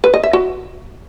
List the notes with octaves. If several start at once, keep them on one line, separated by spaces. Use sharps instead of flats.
B4
D#5
E5
F#4